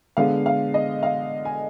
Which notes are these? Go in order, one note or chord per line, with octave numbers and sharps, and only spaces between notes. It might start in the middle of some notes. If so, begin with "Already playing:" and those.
D3 G#3 B3 F5
F5
D#5
F5
G#5